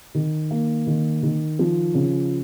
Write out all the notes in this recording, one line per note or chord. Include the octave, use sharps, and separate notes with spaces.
D#3
A#3
D#3
D#3
F3
C#3